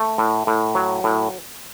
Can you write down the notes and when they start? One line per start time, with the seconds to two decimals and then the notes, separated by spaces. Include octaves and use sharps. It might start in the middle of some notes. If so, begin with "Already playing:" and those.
Already playing: A3
0.18 A2
0.47 A2
0.75 F#3
1.04 A2